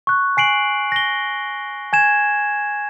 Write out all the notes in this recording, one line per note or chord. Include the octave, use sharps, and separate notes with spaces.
C#6 F#6
G#5 C7 D7 F#7
A#6 G7
G#5 G#6 E7